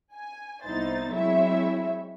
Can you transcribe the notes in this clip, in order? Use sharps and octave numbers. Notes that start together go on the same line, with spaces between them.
G#5
C2 B3 D#4 E4 C5 A6
F#3 G#3 C4 E4 C#5 E5